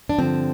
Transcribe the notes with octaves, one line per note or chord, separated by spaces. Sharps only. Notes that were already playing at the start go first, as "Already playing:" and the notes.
D4
G2 D3 F3 C4